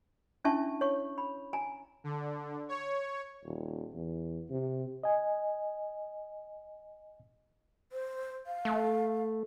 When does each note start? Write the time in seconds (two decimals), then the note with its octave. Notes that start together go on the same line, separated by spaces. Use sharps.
0.44 C#4 D4 E4 E5 A5 C#6
0.81 C#5 C#6
1.18 B5
1.53 G#5 A#5
2.04 D3
2.69 C#5
3.45 D#1
3.94 E2
4.50 C3
5.03 D#5 G#5
7.92 C5
8.46 F5
8.65 A3